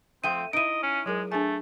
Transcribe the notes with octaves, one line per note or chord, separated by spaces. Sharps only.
F3 A3 C4 G5 D#7
D#4 E4 D#5 D7 D#7
C#4
F#3 G#3 G#4 A#4
A3 D4 G#4 G#5